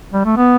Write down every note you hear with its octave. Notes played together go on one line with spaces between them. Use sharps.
G3
A3
B3